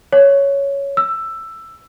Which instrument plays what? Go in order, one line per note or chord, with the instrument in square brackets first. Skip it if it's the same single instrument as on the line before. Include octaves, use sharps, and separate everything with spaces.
[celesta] C#5
E6